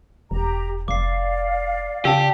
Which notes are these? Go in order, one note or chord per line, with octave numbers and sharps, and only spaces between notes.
E1 G4 A#5
F1 D5 F5 D6 C7
C#3 G4 A5 E6